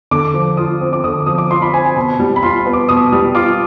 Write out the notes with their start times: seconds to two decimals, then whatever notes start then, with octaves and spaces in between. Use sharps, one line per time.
0.11 D3 D6
0.34 F3
0.57 F4 D#6
0.81 C4
0.93 D6
1.04 D3 D#6
1.26 F3 D#6
1.38 D6
1.50 F4 C6
1.62 B5
1.73 C4 G#5
1.85 G#5
1.96 B2 B5
2.20 G3
2.36 B5
2.43 F4 C6
2.66 B3
2.73 D6
2.89 B2 D#6
3.12 G3
3.35 F4 D6